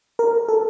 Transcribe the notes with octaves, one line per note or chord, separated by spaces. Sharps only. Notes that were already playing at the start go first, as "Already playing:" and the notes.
A#4
A4